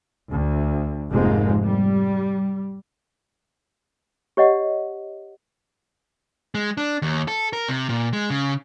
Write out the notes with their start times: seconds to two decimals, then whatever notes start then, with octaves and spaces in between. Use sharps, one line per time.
0.30 D2
1.11 F1 F2 G#2 F3 G#3 A#3
1.64 G3
4.37 G4 C#5 D#5 F#5
6.55 G#3
6.77 D4
7.02 D#2
7.28 A4
7.53 A#4
7.68 C3
7.89 A#2
8.13 G#3
8.30 C#3